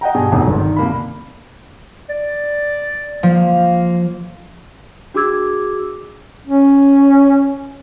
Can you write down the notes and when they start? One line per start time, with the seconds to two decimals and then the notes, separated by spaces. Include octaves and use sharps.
0.01 D#5 F#5 G5 A#5
0.14 G2 B2 G#4 G#5
0.32 F1 B2 D3 D#4 A4
0.47 G1
0.59 D#3
0.77 C2 A#3 B5
2.09 D5
3.23 F3 A#3
5.14 D4 F#4 G#4 D6 E6 G#6
6.47 C#4